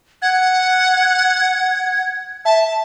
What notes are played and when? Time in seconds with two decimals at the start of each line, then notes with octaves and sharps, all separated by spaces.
0.22 F#5 G#6
2.45 E5 A5